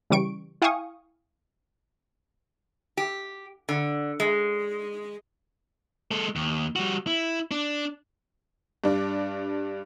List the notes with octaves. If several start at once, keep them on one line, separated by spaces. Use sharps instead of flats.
C#3 E3 G3 C#6 D7
E4 F5 G5 G#5 C#6 D#6
G4
D3
G#3
G#3 A4
D#2
G3 F#4
E4
D4
G2 D4